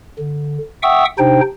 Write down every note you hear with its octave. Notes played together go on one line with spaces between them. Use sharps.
D3
E5 F#5 G5 C#6 D#6 E6
C3 D4 D#4 C5 G5